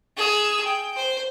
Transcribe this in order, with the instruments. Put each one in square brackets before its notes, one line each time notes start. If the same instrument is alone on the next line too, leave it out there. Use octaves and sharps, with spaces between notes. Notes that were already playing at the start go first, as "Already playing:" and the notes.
[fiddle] G#4 E6
G5
C5